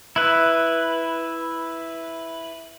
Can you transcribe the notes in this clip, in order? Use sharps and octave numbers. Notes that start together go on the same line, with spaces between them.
E4 B4